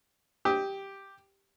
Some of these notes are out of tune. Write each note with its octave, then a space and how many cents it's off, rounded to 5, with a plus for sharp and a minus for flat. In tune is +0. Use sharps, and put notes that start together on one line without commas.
G4 +0 D#6 +30